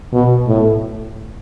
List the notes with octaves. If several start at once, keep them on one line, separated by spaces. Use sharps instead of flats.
B2
A2